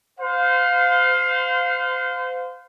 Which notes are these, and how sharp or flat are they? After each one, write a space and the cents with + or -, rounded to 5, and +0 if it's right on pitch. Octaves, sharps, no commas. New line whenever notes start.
C5 -30 F5 +20